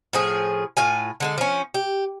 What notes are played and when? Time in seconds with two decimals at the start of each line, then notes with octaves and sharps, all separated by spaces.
0.13 A2 F3 G#4
0.77 A2 F4 G#5
1.20 D3 G#3 A4
1.38 F3 C#4
1.74 G4